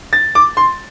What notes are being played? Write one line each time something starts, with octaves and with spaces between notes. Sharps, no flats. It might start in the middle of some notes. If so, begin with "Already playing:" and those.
A6
D6
C6